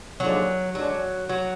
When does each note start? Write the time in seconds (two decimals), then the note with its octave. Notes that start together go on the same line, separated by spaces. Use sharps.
0.20 D#2 D3 F3 F#3 G#3 D4
0.74 D3 F#3 G#3 D4
1.29 F#3